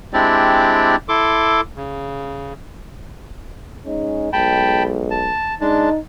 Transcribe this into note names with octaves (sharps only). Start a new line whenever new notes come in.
G#3 C4 D4 E4 G4 D5
E4 A4 C6 D6
C#3
G#3 C#4 D#4
B1 G#3 G5 A5 B5
A5
G#3 D4 D#4 A5